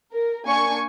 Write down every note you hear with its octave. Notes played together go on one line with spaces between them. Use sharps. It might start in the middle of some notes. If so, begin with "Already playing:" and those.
A#4
A#3 D4 G#5 C#6